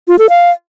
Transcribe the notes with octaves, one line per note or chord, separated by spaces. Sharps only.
F4
A4
F5